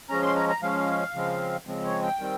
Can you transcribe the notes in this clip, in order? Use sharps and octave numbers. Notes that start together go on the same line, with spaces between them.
F3 G#3 C#4 A#5
C6
A#5
A#5
F3 G#3 C#4 F5
C#3 F3 G#3 C4
C#3 F3 G#3 C4
C#5
G5
D#3 G3 C4